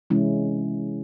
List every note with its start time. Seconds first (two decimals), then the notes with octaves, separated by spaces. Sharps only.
0.10 C3 E3 G#3 C#4 E4